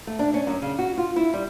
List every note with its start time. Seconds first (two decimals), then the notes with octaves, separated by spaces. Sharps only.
0.07 A3
0.19 D4
0.34 C#4
0.47 F#2
0.62 C#3
0.79 F#4
0.97 F4
1.16 E4
1.33 G3